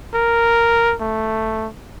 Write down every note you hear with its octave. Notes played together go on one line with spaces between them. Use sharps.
A#4
A3